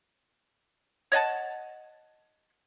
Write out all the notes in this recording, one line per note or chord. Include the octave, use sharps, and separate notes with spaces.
C#5 D#5 F#5 A5